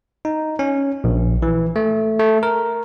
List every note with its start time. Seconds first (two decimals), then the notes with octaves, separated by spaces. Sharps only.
0.25 D#4
0.59 C#4
1.04 A#1
1.42 E3
1.76 A3
2.20 A3
2.43 A#4